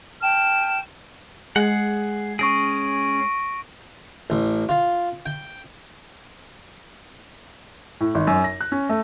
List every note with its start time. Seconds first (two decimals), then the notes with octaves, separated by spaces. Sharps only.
0.22 G5 A5 F6 E7
1.56 G#3 G#4 F#5
2.39 C#4 G#4 C#6 A#6 D7
4.30 A1
4.69 F4
5.26 G5
8.01 A2
8.15 G#1
8.27 F#2
8.44 A#6
8.61 F#6
8.72 C#4
8.89 A3